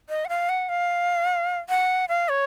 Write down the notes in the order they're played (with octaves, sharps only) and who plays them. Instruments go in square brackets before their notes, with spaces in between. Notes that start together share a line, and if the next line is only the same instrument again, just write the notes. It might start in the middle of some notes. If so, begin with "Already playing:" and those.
[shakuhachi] D#5
F#5
F5
F#5
F5
F#5
F5
C#5